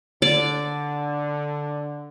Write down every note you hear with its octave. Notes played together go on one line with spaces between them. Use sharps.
D3 D5